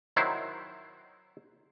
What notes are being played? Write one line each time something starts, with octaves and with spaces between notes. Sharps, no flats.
D#3 F#3 E4 C5